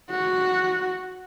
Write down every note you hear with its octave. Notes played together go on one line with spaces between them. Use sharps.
F#4